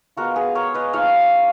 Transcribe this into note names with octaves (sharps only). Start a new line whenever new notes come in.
G#3 B3 F4 F#4 A#4
G#4 B4
A#4 C#5
B4 D#5
F3 A#3 D#4 C#5 F5